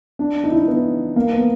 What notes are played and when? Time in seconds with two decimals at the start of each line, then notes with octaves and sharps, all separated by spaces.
0.19 D4
0.44 D#4
0.51 E4
0.59 D#4
0.68 B3
1.16 A#3
1.32 B3